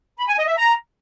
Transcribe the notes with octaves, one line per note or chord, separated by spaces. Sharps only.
B5
G#5
D#5
E5
A#5